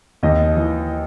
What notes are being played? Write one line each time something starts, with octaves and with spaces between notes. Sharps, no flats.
D#2 D#5
E3